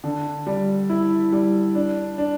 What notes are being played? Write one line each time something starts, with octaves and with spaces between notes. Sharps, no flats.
D3
G3
E4
G3
D4
D4